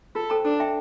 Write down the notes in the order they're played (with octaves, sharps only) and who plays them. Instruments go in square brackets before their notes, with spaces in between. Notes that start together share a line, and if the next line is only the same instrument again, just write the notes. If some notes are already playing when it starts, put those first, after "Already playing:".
[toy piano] F4 [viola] A4
[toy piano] A4 C5 G5 A#5
[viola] D4 [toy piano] A4
[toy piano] E5 G5 A#5